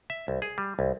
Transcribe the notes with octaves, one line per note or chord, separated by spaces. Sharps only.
E5
C2
G#4
G3
C2